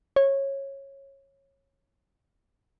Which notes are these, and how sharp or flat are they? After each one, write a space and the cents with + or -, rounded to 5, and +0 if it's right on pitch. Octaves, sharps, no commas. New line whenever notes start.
C#5 -20